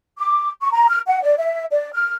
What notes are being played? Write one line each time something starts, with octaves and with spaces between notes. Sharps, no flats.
D6
C#6
A#5
F6
F#5
D5
E5
D5
F6